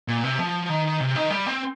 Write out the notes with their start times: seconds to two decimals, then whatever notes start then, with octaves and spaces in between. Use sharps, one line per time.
0.08 A#2
0.24 C3
0.39 F3
0.69 D#3
1.00 C3
1.16 D#3
1.30 G3
1.46 C4